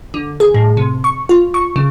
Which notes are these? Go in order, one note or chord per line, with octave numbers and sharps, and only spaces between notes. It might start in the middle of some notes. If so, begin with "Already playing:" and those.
D3
G#4
A2
C3
C#6
F4
C#6
C#3